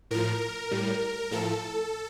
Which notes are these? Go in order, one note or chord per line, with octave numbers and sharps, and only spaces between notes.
A2 F3 A#4
A2 G3
A2 F3 A4